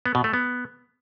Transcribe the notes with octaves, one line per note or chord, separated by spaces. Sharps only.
B3
B2
A3
B3